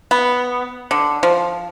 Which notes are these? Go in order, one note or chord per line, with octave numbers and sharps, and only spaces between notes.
B3
D3
F3